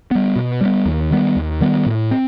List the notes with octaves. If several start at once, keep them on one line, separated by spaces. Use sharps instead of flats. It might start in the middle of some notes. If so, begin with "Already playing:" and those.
G3 B3
B2
G3 B3
D#2
D#3 G3 B3
D#2
D#3 G3 B3
A2
C4